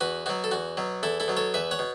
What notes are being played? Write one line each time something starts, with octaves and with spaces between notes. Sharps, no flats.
E2 F#4 B4
B2 F#3 F#4
A4
E2 F#4
B2 F#3
E2 E4 A4
E4 A4
B2 F#3
A4 C#5
E2 B4 E5
C#5 F#5
B2